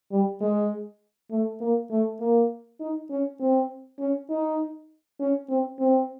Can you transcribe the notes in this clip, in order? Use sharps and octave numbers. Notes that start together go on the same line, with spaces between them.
G3
G#3
A3
A#3
A3
A#3
D#4
C#4
C4
C#4
D#4
C#4
C4
C4